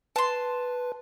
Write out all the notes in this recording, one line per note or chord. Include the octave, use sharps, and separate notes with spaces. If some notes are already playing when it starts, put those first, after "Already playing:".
B4 A5 C6